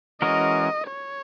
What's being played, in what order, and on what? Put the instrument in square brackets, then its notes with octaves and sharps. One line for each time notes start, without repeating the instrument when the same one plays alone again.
[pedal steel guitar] E3 G#3 C#4 F#4 A#4 [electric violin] D#5
[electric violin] C#5